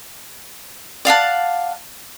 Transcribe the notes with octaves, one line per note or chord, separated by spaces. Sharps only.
D5 F5 F#5 A5